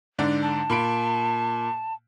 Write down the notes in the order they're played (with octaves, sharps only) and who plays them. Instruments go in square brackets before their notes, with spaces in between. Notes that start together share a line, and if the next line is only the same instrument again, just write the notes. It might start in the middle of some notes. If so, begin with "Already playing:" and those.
[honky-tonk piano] G#2 D3 D4
[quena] A5
[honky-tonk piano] A#2 B5 D7